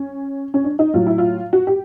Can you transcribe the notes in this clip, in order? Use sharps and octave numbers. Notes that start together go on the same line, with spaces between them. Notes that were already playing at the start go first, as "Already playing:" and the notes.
Already playing: C#4
C#4
D4
D#4
A2 F#3 F4
E4
F4
F#4
G4